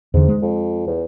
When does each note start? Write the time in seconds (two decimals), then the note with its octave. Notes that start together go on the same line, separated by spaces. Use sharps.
0.14 E2 G#2 D3
0.28 G#3
0.42 F2
0.87 E2